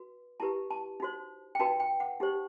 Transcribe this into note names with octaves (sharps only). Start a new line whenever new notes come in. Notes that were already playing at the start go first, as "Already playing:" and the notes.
Already playing: F#4 B4
E4 G4 B4 A5
A5
D#4 F#4 C5
G5
D#4 F#4 B4 A5
G5
F#5
D#4 G4 C5